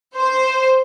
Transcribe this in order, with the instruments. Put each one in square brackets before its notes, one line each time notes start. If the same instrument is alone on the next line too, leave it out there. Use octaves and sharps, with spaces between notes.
[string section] C5